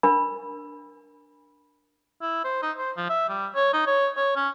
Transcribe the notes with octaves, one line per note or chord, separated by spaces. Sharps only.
D4 A#4 B5
E4
C5
D#4
C5
F3
E5
G3
C#5
D#4
C#5
C#5
C#4